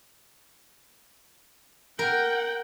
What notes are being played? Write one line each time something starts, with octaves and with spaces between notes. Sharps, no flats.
A#4 F#5 G5